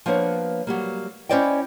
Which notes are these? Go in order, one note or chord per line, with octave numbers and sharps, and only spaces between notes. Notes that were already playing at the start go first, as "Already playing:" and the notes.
F3 A#3 B3 D4 B4 C#5
F#3 G3 A#3
C#4 E4 C5 D5 D#5 G5